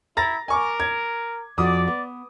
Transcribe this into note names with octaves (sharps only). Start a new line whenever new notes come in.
E4 A#5 A6 A#6
A#4 G#5 C#6 D6
G#6
F2 F3 F#4 D5 D6 D#6
B3